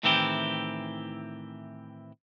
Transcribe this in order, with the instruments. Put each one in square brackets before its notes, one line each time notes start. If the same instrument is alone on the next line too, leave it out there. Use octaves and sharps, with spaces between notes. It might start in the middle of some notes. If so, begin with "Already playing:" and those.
[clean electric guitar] A2 D#3 E3 C4 E4 G4